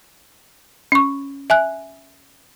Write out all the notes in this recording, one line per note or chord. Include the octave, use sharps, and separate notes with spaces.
C#4 C#6
E5 G#5 F#6